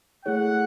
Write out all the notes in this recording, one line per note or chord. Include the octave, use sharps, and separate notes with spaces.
A3 E4 G#4 C#5 F#5